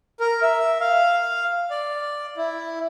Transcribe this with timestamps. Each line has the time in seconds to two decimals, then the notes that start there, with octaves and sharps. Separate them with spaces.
0.20 A#4
0.42 E5
0.80 F5
1.71 D5
2.37 E4